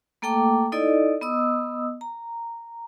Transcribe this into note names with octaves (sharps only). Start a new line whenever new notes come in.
A3 A#3 A4 G5 A#5 D6
D#4 E4 A4 D5 D#5
B3 D#5 D#6 E6
A#5